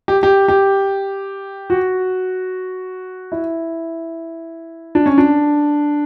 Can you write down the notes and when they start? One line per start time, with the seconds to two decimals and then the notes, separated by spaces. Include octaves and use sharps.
0.08 G4
0.23 G4
0.48 G4
1.70 F#4
3.32 E4
4.95 D4
5.06 C#4
5.18 D4